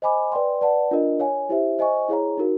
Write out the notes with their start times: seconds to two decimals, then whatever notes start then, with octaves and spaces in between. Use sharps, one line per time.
0.02 C5 D#5 G#5 B5 D6
0.32 B4 D5 G5 C6
0.61 B4 D5 F#5 A5
0.91 D4 F4 A#4 D#5
1.20 C#5 F5 G#5
1.49 E4 G4 C5 E5
1.79 C5 D#5 G#5 C#6
2.08 E4 G#4 C#5 F5 A#5
2.37 D#4 F#4 A#4